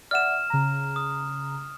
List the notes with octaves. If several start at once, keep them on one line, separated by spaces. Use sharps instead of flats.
D5 E5 F#5 F6 E7
C#3 A#5
D#6